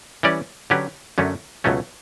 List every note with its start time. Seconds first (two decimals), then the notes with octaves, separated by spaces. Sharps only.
0.23 E3 G3 C#4 G4 D5
0.70 D3 F#3 C#4 G4 B4
1.18 F#2 D3 F#3 A3 C#4
1.64 C#2 B2 F#3 A3 C#4